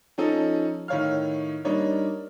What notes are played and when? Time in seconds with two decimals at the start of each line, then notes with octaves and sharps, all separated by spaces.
0.18 F3 C#4 D#4 A4
0.88 A2 D#3 C#5 F5 F6
1.65 G3 A#3 D4 D#4 C#5